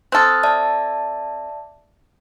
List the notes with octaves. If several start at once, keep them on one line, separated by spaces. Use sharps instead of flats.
C4 A4 D#6 F6 F#6
D5 E5 A5